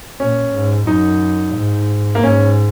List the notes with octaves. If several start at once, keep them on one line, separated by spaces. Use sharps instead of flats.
A#2 C#4
G#2
F#2 D#4
G#2
A#3
G#2 C#4